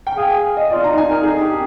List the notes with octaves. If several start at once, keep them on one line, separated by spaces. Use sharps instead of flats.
G5
G#4 F5
D#5
F4 D5
D#4 A#5
D#4 G#5
D#4 A#4
D#4 G#4
D4 G4